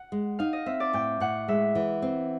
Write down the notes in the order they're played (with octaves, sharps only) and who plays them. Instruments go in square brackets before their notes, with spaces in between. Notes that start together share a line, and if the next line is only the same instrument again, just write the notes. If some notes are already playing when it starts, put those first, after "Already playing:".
Already playing: [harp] F#5
[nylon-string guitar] G#3
[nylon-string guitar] D#4 [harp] F5
[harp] D#5
[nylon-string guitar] C4 [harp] E5
[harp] D5
[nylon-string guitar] A2 [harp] G5
[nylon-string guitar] A2 [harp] F#5
[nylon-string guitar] G#3 [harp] E5
[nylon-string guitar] E3
C4